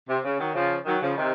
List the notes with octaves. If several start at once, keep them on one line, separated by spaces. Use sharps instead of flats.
C3
C#3
D#3 F#3
C#3 F3
D#3 F#3
C#3 F3
C3 D#3